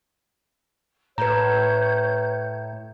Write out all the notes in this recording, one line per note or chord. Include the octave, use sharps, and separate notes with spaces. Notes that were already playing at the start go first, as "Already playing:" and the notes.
A2 B4 C#5 A#5 G6